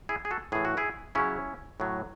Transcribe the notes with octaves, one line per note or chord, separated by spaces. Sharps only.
E4 G#4
G#4
F#4 A4
A2 E3 G#4
F#4
E4 G#4
C#3 F#3 C#4 E4
A2 F#3